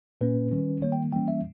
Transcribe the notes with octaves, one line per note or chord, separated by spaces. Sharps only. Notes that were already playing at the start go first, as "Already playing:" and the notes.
A#2 A#3 C#4 B4
D#3 G3 C#4
D#3 G3 A#3 C#5
G5
E3 G3 A#3 C#4 G5
E5